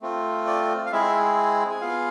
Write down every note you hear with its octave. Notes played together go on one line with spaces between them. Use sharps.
A3 C4 F4
D5
F5
G#3 C4 E4 G#4 E5
G#5
B3 F4 G#4 F5